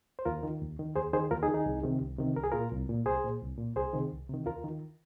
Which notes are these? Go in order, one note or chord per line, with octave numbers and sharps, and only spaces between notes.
C5
D#2 F4 A#4
D#3
D#2
D#3
D#2 G#4 C5
D#3 G#4 C5
D#2 F4 A#4
D#4 G#4
D#3
D#4 G#4
C2
C3 D#3
C2
C3 D#3
C2 A#4
G#4
A#2 F4 A#4
C2
A#2
C2 G#4 C5
A#2
C2
A#2
C2 G#4 C5
C3 D#3
C2
C3 D#3
D#2 F4 A#4
D#3